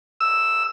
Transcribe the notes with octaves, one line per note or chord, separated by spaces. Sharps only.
E6